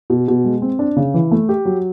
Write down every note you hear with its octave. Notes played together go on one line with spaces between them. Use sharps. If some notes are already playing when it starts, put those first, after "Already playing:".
B2
B2
G#3
C4
D4
C#3
E3
A3
G4
F#3